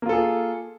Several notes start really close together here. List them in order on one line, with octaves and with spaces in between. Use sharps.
A#3 F4 A4 G#4